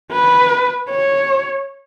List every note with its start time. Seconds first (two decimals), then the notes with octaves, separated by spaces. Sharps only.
0.12 B4
0.90 C#5